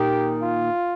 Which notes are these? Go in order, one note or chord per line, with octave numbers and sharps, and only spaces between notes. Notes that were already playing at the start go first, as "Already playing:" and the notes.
Already playing: A#2 D#3 G4
F4